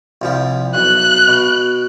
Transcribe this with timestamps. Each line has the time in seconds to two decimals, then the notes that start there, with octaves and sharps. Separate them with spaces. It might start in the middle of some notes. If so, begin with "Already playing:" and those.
0.22 C2 F3 G3
0.75 B1 F#6
1.28 B2